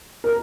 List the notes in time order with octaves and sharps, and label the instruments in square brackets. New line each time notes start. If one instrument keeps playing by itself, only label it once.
[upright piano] A#4